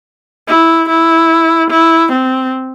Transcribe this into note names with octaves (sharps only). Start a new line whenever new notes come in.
E4
E4
E4
C4